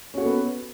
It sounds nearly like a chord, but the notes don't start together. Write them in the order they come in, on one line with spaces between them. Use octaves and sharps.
C#4 F#4 A4 B3